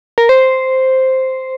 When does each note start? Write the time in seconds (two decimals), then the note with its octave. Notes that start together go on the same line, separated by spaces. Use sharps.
0.18 A#4
0.29 C5